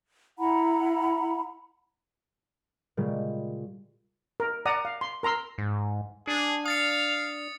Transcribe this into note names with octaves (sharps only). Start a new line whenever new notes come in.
E4 F#5 A#5 B5
A#2 C#3 G3 G#3
A#4
D5 F#5 A#5 D#6
F5
C6
A#4 A#5 C6 E6
G#2
D4 G#4
F5 D#6 A6 C#7